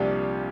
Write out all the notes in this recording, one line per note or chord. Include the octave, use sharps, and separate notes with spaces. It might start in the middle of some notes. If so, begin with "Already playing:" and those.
Already playing: C2 A#2 F3 D4 G4